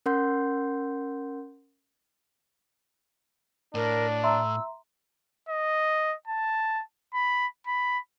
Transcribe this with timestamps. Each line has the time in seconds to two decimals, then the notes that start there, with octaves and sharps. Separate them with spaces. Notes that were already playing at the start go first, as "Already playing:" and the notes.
0.06 C#4 A#4 F#5 C6 G6
3.75 A2 D4 A#4
4.23 E5 A#5 C6 E6
5.49 D#5
6.27 A5
7.14 B5
7.67 B5